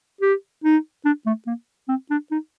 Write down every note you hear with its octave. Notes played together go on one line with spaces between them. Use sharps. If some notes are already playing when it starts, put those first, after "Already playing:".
G4
D#4
D4
A3
A#3
C4
D4
D#4